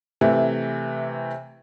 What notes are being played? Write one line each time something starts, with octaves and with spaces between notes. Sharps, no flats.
C3 E3 A3